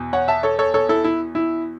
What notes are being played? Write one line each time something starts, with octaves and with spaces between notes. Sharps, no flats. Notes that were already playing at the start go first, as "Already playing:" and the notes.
Already playing: E2 B2
C#5 F#5
E5 A5
A4 C#5
A4 C#5
A4 C#5
E4 A4
E4
E4